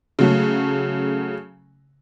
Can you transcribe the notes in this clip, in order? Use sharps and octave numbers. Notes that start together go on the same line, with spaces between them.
C#3 F#3 A3